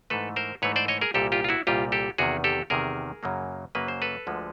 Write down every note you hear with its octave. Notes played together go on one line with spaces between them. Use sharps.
G#2 E3 A3 A4 B4
A#4 C5
G#2 E3 A3 B4 C#5
C5 D5
C#5 D#5
G#4 A#4
C2 A#2 G3 G4 A4
F4 G4
F4
E4 F#4
C2 A#2 G3 F4 G4
G4 A4
E2 C3 D#3 F#4 G#4
G4 A4
E2 C3 D#3 G#4 A#4
F#2 C#3 F#3 A#3
F#2 C#3 F#3 A#3 B4
C5
A4 B4
D2 D3 F3 G#3